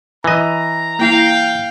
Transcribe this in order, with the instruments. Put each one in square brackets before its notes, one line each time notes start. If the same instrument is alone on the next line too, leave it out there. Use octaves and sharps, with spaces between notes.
[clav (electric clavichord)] E3 D#5 [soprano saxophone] A#5
[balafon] A#3 E4 [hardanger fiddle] F5 G5